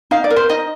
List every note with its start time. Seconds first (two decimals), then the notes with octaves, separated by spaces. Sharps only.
0.11 D#4 F5
0.24 D5
0.30 A#4
0.36 C5
0.49 D#4 D#5